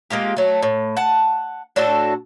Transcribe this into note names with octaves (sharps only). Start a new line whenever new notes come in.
G#3 A#3 F4 G4
F#3 A3
A2
F#5 A5
A2 D4 F#4 A4